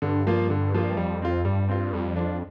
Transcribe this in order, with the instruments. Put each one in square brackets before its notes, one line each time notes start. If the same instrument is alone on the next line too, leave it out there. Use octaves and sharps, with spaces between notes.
[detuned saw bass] G2 [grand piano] D3
[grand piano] F3 A#3 F4
D3
F3 A#3 F4
[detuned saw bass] F2 [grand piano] G3
[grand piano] C4 F4
[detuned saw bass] G2 [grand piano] G3
[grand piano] C4 F4
[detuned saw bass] F2 [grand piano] G3
[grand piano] D4 F4